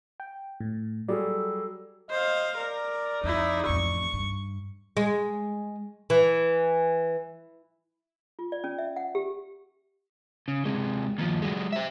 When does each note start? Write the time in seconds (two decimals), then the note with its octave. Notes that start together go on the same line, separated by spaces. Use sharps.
0.20 G5
0.60 A2
1.08 F#3 G3 G#4 A4 D5
2.10 C5 D#5 F5
2.57 A#4 D5
3.24 F2 D#4 E4
3.66 A1 F2 C#6
4.13 G2
4.97 G#3
6.10 E3
8.39 F4
8.52 D5
8.64 C#4
8.78 E5
8.96 F#5
9.15 G4
10.48 C#3
10.65 C3 G#3
11.18 D#2 F3
11.42 F#3 G#3
11.73 C5 E5